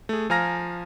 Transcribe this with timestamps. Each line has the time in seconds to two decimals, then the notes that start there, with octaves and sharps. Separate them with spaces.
0.09 A3 G#4
0.30 F3 F5 G#5 A#5 F6 A#6